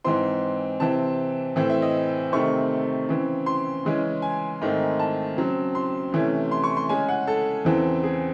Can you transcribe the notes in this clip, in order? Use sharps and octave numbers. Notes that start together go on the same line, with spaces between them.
G#2 E3 C4 C6
C3 E3 C4 A5
A2 E3 C4
E5
D#5
C3 D#3 A3 C4 C#6
C#3 E3 C4
C6
C#3 E3 G#3 C#4
G#5
G#2 D#3 A3 C4
A5
C#3 F#3 C4
C6
C3 E3 A3 C#4
C6
C#6
C6
C#3 G#3 C#4 G#5
F#5
A4
E2 C#3 E3 C4
G#4